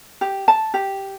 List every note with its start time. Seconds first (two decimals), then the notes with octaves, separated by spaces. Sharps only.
0.21 G4
0.48 A5
0.74 G4